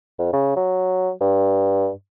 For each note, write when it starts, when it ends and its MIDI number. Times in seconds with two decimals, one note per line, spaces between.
0.19 0.28 41
0.33 0.55 49
0.56 1.11 54
1.21 1.90 43